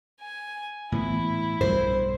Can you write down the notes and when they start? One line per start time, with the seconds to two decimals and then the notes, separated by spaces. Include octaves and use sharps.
0.21 G#5
0.92 A2 E3 B3 E4
1.61 B1 G2 C5